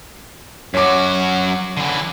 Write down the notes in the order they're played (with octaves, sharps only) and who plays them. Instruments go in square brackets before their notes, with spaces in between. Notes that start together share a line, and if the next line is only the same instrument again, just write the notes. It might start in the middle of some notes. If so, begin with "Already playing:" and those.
[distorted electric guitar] F#2 F#4 [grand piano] C#5 D6
[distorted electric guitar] D3 E3